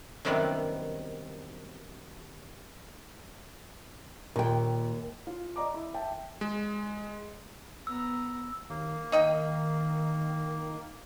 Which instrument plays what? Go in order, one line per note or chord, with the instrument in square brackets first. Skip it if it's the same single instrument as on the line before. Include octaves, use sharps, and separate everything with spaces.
[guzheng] F#2 C3 D#3 G3 B3 E4
[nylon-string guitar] D#2 G5 [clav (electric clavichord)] A#2
[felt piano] F4
D5 D#5 A#5 D6
E4
E5 G5 A5
[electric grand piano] G#3
[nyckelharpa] B3 A#5 [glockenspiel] E6
[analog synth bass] D#2 [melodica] A#3
[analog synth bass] D#3 [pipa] D#4 D#5 G5